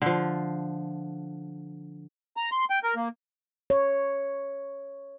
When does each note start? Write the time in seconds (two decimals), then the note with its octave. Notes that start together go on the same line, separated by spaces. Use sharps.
0.02 D3 F3
2.37 A#5
2.52 C6
2.70 G5
2.83 A#4
2.96 A#3
3.70 C#5